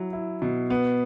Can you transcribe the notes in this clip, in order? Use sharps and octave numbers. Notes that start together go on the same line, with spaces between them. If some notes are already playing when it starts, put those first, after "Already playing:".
Already playing: F#3 E4
E4
B2
B3